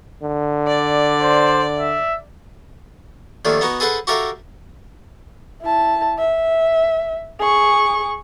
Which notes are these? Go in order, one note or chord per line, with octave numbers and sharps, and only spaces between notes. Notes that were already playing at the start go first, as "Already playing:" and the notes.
D3
D5
C5
E5
D#2 D3 D#3 F3 A3
B3 D#4 F#4
G#4 A4 B4 C5 F#5 B5
F#4 G4 A4 A#4 E5 F5
E4 A5
E5
G#4 C#6